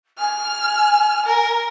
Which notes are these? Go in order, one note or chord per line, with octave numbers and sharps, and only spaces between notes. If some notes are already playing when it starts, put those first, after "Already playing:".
G#5 F6
A#4